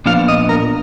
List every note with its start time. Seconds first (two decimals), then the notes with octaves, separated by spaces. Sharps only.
0.06 A#2 F3 B3 D4 F5
0.28 D#5
0.49 A#4